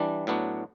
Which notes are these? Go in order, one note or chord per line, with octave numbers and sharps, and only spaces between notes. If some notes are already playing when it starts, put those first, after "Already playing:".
Already playing: E3 G3 D4
A2 F#3 B3 D4 F#4